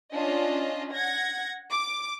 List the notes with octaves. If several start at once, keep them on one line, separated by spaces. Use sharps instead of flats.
C#4 D4 F4 D#5
F#5 G#6 A#6
D6